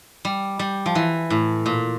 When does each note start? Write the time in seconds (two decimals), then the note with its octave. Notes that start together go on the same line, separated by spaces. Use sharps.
0.25 G3
0.59 G3
0.86 F3
0.95 E3
1.30 A2
1.66 A#2